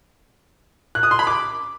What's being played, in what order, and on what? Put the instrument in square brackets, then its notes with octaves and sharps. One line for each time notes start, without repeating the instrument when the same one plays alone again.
[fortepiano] F#6
D#6
C6
B5
D6